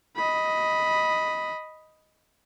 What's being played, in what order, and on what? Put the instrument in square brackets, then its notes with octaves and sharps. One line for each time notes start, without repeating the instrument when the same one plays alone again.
[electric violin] D#5 B5